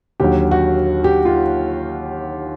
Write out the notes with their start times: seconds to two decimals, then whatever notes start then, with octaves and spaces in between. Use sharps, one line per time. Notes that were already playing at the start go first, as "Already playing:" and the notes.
0.20 D#2 D3 F#3 G4
0.51 F#4
1.04 G4
1.25 F4